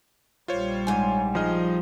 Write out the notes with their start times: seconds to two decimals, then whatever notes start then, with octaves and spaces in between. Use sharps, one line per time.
0.48 A#1 G3 F4 C5 C#5
0.87 G#2 G#5
1.35 F3 D#4 G#4 D#5 F6